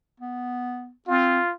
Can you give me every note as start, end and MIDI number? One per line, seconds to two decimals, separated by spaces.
0.20 0.90 59
1.08 1.39 60
1.08 1.53 65